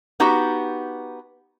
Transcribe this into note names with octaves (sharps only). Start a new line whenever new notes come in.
B3 D#4 F#4 G4